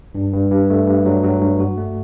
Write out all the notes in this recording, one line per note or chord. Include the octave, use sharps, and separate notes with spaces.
G2
G2
G2
A3
G2
F#3
F#3
G2
F#4
A3